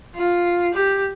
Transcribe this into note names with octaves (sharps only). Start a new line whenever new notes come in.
F4
G4